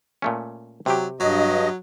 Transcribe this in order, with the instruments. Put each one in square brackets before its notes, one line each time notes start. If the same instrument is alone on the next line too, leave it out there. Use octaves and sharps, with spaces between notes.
[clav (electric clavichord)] A#2 A3 C#4
[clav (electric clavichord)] C3 G4 [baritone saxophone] F#3
[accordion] G2 D#5 [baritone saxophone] F#3